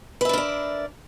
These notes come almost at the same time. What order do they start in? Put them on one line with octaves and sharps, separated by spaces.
B4 E5 D4 A#4 D5